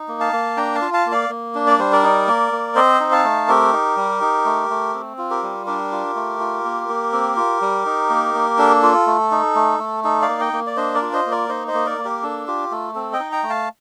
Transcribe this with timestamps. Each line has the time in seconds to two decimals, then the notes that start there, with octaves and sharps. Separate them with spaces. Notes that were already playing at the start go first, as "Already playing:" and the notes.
Already playing: D#4
0.08 A#3
0.20 F5 A5
0.33 A#3
0.57 D4 G5 A#5
0.75 F5 A5
0.82 F4
0.94 F5 A5
1.06 A#3
1.12 D5 F5
1.29 A#3
1.55 D4
1.67 D5
1.78 G3 C5
1.93 A#4 D5
2.03 D#4
2.27 A#3
2.52 A#3
2.75 C4 C5 D#5
3.00 D#4
3.12 F5 A5
3.24 A3
3.48 C4 G4 A#4
3.73 D#4
3.97 G3
4.21 D#4
4.45 A3
4.70 A3
4.94 C4
5.18 F4
5.30 G4 A#4
5.43 G3
5.66 D4 G4 A#4
5.92 F4
6.15 A3
6.40 F4
6.64 A#3
6.89 A#3
7.12 C4
7.36 F4
7.61 G3
7.86 D#4
8.10 A#3
8.34 A#3
8.58 D4 A4
8.83 F4
9.07 A3
9.31 D#4
9.55 A3
9.79 A3
10.04 D#4 A4
10.22 D5 F5
10.28 A#3
10.40 D#5 G5
10.53 A#3
10.67 D5
10.76 D4 C5 D#5
10.95 A#4 D5
11.02 F4
11.13 C5 D#5
11.26 A#3
11.31 A#4 D5
11.49 D#4 C5 D#5
11.68 C5 D#5
11.74 A#3
11.86 A#4 D5
11.98 A#3
12.05 G4 A#4
12.23 D4 A4
12.47 F4 G4
12.71 A3 A4
12.95 C4 A4
13.13 D#5 G5
13.20 D#4
13.32 G5 A#5
13.43 A3
13.49 F5 A5